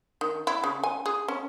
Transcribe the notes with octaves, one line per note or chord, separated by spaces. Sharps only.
D#3
E4
C#3
G#5
G#4
C#4